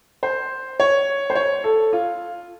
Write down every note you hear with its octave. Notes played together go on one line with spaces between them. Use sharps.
C5
C#5
C5
C#5
A4
F4